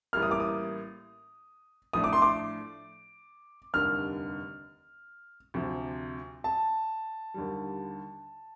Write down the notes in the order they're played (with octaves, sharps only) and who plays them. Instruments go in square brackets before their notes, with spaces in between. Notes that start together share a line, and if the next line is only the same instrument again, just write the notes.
[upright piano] A1 A2 G3 A#3 [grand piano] F6
[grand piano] D#6
D6
D#6
[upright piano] A2 F3 A3 D4 [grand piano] D#6
[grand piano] D6
C6
D6
[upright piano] F1 D#2 D3 G3 D4 [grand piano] F6
[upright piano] D2 C3 F3
[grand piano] A5
[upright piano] D#2 D3 G3